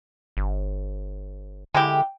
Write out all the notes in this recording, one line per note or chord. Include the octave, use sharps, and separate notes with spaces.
G1
D3 G#3 E4 G4 G5